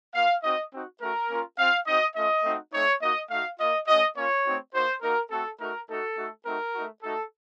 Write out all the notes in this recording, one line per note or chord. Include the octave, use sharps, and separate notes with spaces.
A#3 F4 F5
C4 D#4 F#4 D#5
C4 D#4 F#4
A3 C#4 F#4 A#4
A#3 C#4 F4
C4 F4 F5
C4 D#4 F#4 D#5
A3 C#4 F4 D#5
A3 C4 D#4 F#4
A3 C4 D#4 C#5
A#3 D#4 F#4 D#5
A3 D#4 F#4 F5
A#3 F4 D#5
A3 C#4 F#4 D#5
A#3 C#4 F4 C#5
A3 C4 D#4 F#4
A#3 D#4 F#4 C5
A#3 D#4 F#4 A#4
A3 C4 F#4 A4
A3 D#4 F#4 A#4
A3 D#4 F#4 A4
A3 D#4 F#4
A3 C4 D#4 F#4 A#4
A3 D#4 F#4
A3 D#4 F#4 A4